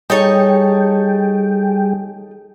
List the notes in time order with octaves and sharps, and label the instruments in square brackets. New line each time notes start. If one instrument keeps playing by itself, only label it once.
[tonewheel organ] G3 G#4 G5 [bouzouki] D#4 A4 C#5